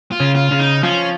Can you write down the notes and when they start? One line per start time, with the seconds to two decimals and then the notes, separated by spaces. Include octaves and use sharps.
0.12 F4
0.20 C#3 C#4
0.35 F4
0.51 C#3 C#4
0.59 D#4
0.83 F3 C#4 F4